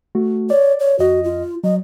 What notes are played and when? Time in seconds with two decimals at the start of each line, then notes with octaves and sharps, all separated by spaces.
0.15 A3 F#4
0.50 C#5 D5
0.80 C#5
0.99 F2 F#4 D#5
1.24 F4
1.64 F#3 D#5